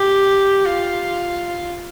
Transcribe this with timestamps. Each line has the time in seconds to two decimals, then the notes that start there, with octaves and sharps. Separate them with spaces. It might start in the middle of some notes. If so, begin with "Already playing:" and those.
Already playing: G4
0.65 F4